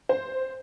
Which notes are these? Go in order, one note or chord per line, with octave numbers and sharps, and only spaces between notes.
C5